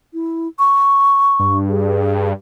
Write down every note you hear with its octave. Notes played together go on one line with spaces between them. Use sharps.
E4
C#6
G2
G#4